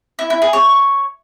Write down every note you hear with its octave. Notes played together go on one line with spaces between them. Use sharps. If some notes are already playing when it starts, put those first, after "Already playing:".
E4
E4
G#4
C#5